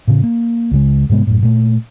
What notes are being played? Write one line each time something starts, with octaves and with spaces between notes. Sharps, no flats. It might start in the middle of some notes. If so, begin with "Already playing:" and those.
A2 C#3
A#3
C#2 C#3 G#3
G#2 C3 G#3 B3
F#2 A2
A#2 A3